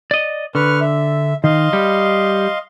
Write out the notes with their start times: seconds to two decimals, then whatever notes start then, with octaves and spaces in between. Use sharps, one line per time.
0.11 D5 D#5
0.55 D3 B4 C#6 F6
0.81 E5
1.44 D#3 D#5 F5 C6
1.73 G3